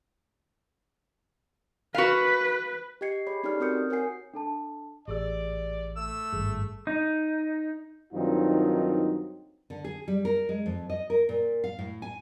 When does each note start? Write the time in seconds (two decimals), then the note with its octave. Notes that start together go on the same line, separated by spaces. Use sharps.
1.95 F#4 B4 F5
3.01 G4 D#5 G5 G#6 C7 C#7
3.27 G#4 C#5 B5 C7
3.43 C#4 D#4 G4 A4 D5 F6
3.60 C4 F#4 A#4 D#6 G6 C#7
3.90 A#4 C#5 F#5 G#5 C7
4.34 D4 A4 A5
5.08 A1 G4 G#4 D5 E6
5.97 A3 E6
6.32 G#1 G2 G#4
6.87 D#4
8.13 G2 D#3 F#3 C4 D#4 F4
9.70 D3
9.84 G#4
10.08 G3
10.25 A#4
10.49 G#3
10.66 F2
10.90 D#5
11.10 A#4
11.29 A#2
11.64 F5
11.79 A2
12.02 G#5